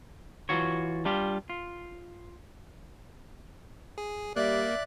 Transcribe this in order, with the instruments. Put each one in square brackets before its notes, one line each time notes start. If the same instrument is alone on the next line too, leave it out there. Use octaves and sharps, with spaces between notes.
[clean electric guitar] E3 F4 F#4 C#5
G3 D4 F4 G4
F4
[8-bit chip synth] G#4
[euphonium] G3 [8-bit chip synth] A#3 [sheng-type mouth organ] D5 F#6 [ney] E5